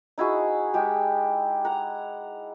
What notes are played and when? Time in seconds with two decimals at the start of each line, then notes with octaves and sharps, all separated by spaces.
0.18 D#4 E4 F#4 G#4
0.74 G#3 G4
1.65 F#5 A#5